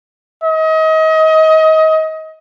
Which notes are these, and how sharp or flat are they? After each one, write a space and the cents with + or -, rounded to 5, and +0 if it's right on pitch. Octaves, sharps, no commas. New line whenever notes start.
D#5 +30